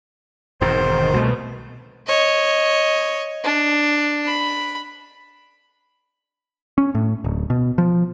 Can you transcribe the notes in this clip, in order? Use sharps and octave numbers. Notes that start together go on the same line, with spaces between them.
E1 G#2 C3 D#3 C5
C2 B2 A3
C#5 D#5
D4
B5
C#4
A2
D1
B2
F3